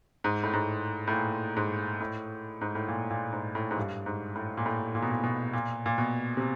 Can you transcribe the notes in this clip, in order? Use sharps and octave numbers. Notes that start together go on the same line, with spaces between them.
G#2
A2
G#2
A2
A#2
G#2
A2
G#2
A2
A#2
A#2
G#2
A2
G#2
G2
G#2
A2
A#2
A2
A#2
B2
A#2
B2
A#2
A#2
B2
C3